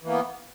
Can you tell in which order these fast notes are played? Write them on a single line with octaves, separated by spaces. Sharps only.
E3 A#3 B3